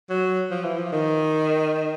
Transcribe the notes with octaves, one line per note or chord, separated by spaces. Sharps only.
F#3
F3
E3
F3
D#3